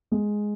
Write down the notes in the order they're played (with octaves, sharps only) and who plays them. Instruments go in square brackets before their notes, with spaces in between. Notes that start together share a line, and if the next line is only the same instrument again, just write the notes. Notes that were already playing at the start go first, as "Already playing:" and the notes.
[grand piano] G#3